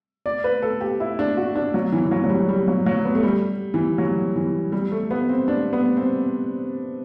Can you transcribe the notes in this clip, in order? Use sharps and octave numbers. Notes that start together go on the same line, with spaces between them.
D5
B4
A4
G4
E4
D4
F#4
D4
F#3
E3
E3
F#3
F#3
G3
G3
F#3
F#3
B3
A3
G3
E3
F#3
E3
G3
A3
B3
C4
D4
B3
C4